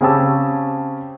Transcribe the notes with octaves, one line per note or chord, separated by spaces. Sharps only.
C#3 C4 C#4 G4 A5 E6